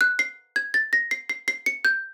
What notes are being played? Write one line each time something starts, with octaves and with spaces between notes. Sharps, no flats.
F#6
C7
G#6
A6
A#6
C7
C7
C7
C#7
G6